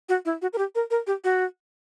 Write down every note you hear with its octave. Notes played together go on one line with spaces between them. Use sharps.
F#4
E4
F#4
A#4
G4
A#4
A#4
G4
F#4